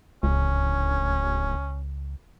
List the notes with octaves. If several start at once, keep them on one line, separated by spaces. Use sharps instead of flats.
D1 C#2 C#4